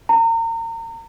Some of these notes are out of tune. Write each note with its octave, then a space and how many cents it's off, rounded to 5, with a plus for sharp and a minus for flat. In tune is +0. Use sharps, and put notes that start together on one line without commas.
A#5 -35